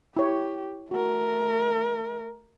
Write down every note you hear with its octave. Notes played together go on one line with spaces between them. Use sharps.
E4 G4 C#5
A3 F#4 A#4